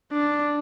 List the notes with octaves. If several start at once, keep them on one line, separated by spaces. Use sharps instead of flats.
D4